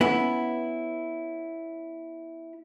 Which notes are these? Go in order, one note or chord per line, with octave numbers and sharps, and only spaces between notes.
B3 C#4 E4